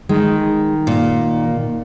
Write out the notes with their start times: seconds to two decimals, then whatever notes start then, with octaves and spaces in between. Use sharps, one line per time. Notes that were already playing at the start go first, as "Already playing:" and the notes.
0.09 D#3 G#3
0.87 A#2